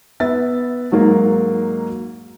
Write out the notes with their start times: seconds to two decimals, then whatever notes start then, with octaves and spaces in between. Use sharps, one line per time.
0.20 B3 E5 A6
0.91 G#2 F#3 G#3 A#3